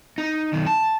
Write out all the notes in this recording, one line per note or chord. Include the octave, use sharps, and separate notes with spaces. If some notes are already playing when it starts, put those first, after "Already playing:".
D#4
B1 D#3
A5